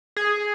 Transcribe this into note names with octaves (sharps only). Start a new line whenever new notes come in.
G#4